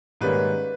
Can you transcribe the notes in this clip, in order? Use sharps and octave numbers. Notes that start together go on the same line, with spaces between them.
G#2 D#3 G3 A#3 C#4 B4